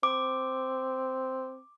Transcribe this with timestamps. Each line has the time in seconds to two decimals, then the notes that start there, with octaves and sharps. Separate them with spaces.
0.03 C4 D6